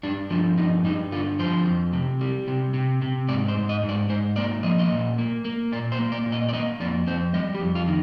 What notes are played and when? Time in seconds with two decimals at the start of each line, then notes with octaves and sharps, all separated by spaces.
0.03 G2 D4
0.31 F3 D4
0.58 G2 D#4
0.85 G2 D#4
1.12 D3 F4
1.39 F3 C5
1.66 F2
1.93 C3
2.21 G3
2.48 C3
2.74 C3
3.02 C3
3.28 G#2 D5
3.48 C5
3.56 G#2
3.69 D#5
3.83 G#2
3.89 D5
4.09 G#2 C5
4.36 A#3 D5
4.63 F3 D#5
4.79 D#5
4.91 A#2
5.18 A#3
5.45 A#3
5.72 A#2 D5
5.92 C5
5.99 A#3
6.12 D5
6.26 A#2
6.32 D#5
6.49 D5
6.53 A#3 D#5
6.80 F2 D5
7.07 F2 C5
7.34 G3 D#5
7.54 G4
7.61 F2
7.75 F4
7.88 D#3